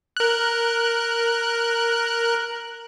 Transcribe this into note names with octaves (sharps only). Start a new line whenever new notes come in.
A#4 F#6